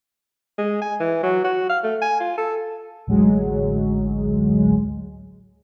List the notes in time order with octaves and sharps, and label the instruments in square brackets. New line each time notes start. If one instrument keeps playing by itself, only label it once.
[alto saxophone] G#3
G#5
E3
F#3
F#4
F5
A3
G#5
F4
A4
[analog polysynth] A1 D2 F#3 G#3